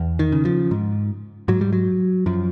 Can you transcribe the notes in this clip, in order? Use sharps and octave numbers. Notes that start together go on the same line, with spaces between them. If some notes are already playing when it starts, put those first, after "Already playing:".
Already playing: E2
D#3
C#3
F3
G#2
G#2 F#3
G3
F#3
F#2 F3